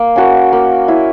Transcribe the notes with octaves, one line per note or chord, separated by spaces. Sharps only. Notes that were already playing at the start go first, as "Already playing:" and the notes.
Already playing: A#3
C#4 F#4 A#4
A#3
C#4 E4